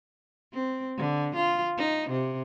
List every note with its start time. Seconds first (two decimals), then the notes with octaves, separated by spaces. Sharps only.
0.53 C4
0.98 D3
1.36 F4
1.78 D#4
2.10 C3